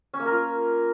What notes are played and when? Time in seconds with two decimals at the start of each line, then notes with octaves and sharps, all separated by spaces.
0.14 C#4
0.20 A#3
0.26 A#4
0.32 F4